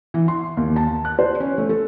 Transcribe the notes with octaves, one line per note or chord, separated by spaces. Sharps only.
E3
C6
D#2
A5
F#6
C5
C#4
A3
A4